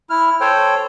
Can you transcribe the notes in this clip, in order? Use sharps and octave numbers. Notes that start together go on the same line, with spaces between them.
E4 F6
A4 C5 C#5 G5